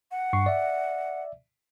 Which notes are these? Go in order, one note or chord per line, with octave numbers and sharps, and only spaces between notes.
F#5
G2 C#6 C7
D5 E5